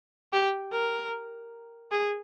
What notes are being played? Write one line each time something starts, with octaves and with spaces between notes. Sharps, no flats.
G4
A#4
G#4